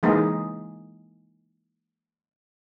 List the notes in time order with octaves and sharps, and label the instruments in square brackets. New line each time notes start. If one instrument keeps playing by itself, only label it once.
[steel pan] E3 G#3 A#3 D#4 G#4